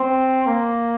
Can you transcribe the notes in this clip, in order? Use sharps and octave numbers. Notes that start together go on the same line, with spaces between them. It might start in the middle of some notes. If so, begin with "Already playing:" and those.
Already playing: C4
A#3